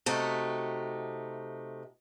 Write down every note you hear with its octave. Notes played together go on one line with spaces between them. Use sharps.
C3 A3 D#4 F#4